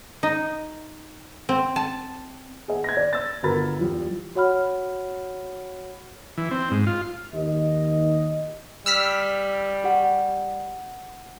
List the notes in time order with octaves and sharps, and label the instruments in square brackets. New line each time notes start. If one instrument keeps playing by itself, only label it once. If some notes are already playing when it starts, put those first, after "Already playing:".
[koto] D#4
C4
A5
[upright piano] G#4 D#5 F#5
G#6 A#6
D5
E6 A6
G1 F#4 A#4 B5 A6
E2 F3 G3
[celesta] F#4 C#5 F#5 B5 F6
[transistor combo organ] E3
C4
G#2
F4
[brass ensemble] D#2 D#5
[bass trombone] G3 [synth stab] E6 F6 B6
[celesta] G4 F#5